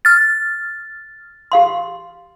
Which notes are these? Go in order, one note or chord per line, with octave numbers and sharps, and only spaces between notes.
F6 A6
G4 F5 C6